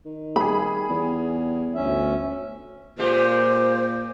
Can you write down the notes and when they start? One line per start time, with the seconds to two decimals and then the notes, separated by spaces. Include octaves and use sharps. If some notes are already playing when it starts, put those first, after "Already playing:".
0.06 D#3
0.36 G3 G#4 B5
0.89 E2
1.75 G1 D2 C#4 E5
2.98 A#2 G#3 F4 G4 C5